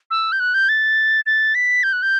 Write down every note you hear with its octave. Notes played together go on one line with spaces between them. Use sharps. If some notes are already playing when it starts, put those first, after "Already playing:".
E6
G6
F#6
G6
A6
A6
B6
G6
F#6
G6